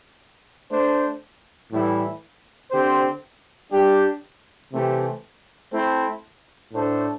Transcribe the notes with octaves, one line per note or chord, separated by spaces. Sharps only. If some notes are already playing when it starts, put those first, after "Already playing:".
A3 D4 C5
A2 E3 G3 E4
D3 C4 G4 C5
G3 D4 G4
C3 E3 A3 C4 G4
A3 C4 E4 A4 C5
A2 A3 D4 A4 C5